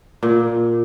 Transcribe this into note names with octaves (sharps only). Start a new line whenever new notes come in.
A#2